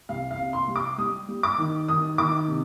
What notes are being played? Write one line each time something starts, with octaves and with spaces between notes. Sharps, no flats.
C2 F5
F5
C3
C6
G3
D6
G3 D#6
G3
D6
D#3
D#3 D#6
D#3 D6
C3